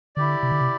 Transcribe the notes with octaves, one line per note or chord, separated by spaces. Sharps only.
D3 E4 G4 D5
C3
D3
C3